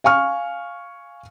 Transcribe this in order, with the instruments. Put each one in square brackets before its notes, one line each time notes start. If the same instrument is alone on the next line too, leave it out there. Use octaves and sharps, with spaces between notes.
[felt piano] F5 G#5 C#6 F6